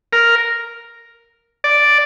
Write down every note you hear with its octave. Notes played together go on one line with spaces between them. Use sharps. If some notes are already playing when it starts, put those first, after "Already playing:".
A#4
D5